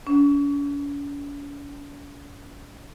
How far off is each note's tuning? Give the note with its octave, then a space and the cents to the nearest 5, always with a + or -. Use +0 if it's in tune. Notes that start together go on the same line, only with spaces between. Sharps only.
C#4 +45